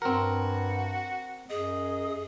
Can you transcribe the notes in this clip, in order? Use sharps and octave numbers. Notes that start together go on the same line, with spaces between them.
G2 C4 F#4 A#4
F#2 G#4 D#5